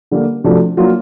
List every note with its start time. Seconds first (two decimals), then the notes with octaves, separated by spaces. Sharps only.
0.11 D3 G3 A#3
0.44 C3 F3 A3 D4 F#4
0.77 F#3 A#3 D4 F4